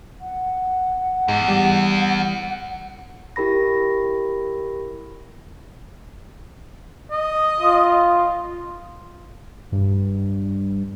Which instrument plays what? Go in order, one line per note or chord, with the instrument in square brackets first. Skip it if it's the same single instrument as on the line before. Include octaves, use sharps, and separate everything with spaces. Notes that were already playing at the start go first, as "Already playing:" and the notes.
[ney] F#5
[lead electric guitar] E2 [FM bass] G#2
[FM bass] G3
[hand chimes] E4 G4 A#4 B5 A#6
[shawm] D#5
[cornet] F4
[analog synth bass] G2